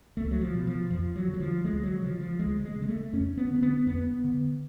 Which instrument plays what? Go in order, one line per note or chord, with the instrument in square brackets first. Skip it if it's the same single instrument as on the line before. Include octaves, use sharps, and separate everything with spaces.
[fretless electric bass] C#2 A3
F#3
F3
B2
F3
F2 F3
F#3
D3
F#3
F3
D2 G#3
F#3
C#3 F3
F3
D2 G#3
G#3
C#3
G#3
A3
F2 C#4
B3
D3
C#4
B3
F2 B3
D3